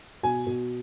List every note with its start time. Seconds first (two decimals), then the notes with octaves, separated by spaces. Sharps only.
0.23 B2 G#5
0.47 B2